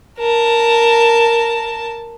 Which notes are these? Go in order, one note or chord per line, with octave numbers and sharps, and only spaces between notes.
A#4 A5